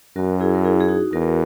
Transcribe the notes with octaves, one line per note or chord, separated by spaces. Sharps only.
F#2 F#4 A#4
E4 G#4
A#4
E4 G#4
G#4
D#4 F#4
E2 F#4 A#4